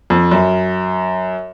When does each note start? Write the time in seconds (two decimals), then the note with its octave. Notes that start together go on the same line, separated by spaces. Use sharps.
0.10 F2
0.31 F#2